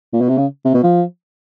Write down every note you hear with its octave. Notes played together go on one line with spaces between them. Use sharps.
A#2
B2
C3
C#3
C3
B2
F3